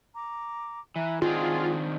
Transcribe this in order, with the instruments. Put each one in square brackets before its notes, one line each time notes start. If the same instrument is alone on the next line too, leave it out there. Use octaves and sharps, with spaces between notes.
[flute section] A#5 D6
[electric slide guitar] E3 [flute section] E5 A#5 F#6
[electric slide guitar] D#3 C4 D4 [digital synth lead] F4 [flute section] F#4 G#4 D#6